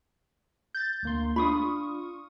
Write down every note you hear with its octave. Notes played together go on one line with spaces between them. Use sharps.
G6 A6
D2 A#3 C6
D4 F4 B5 C#6 D#6